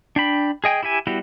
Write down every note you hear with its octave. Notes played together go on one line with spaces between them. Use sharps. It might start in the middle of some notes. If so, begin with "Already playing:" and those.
D4 G5 B5
G#4 D#5 G5 G#5
E4 G4 E5 G#5
G3 B3 E4 F#4 G4